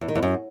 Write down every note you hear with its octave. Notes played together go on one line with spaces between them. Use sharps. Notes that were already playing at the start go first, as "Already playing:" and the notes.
E2
D#3
E2
F#2